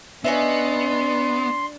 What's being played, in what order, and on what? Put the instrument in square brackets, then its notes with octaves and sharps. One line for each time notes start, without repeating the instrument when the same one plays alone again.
[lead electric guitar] B3 [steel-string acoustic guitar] C#4 D#5 E5 [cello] D4 [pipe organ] C6